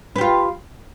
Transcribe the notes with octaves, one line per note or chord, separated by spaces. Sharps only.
F4 G4 B4